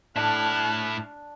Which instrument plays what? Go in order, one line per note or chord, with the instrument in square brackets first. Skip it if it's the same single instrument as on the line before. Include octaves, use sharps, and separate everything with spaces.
[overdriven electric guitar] A2 E4 [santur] D4 [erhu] A5 [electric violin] F6 F#6